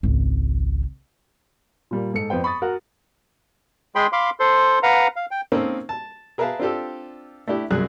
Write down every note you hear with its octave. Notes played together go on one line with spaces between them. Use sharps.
G#1 C#2
A#2 G3 A#3
G#2 A4 C#7
F2 B3 C5 G5
B5 C#6 D#6 A6
F#4 A#4 F#5
G#3 G#4 G5 B5 C6
F5 B5 C6 D6
A4 C5 C6
B4 F5 F#5 A#5
F5
G5
A#3 C4 C#4 D#4 A4
A5
G#4 A#4 B4 E5 F5 A5
C4 D4 F4 G4 A4
A3 D4 E4 G4
C2 F#2 G#4 D5 F#6